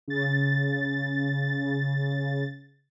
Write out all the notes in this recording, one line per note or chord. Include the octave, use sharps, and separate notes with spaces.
C#3 A6